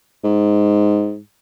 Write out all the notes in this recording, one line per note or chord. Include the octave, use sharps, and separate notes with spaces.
G#2